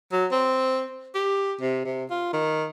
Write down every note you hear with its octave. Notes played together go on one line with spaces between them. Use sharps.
F#3
C4
G4
C3
C3
F4
D#3